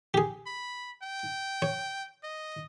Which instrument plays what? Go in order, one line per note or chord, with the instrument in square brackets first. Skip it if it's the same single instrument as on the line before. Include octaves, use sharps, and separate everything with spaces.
[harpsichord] G4 G#4
[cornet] B5
G5
[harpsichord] C#5
[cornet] D#5